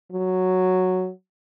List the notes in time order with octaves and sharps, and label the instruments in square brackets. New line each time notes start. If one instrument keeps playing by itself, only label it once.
[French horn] F#3